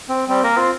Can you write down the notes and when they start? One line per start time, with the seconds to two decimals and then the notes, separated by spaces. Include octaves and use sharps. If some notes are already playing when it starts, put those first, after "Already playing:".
0.09 C4
0.29 G3 C4
0.43 A#3 A#4
0.57 C4 F4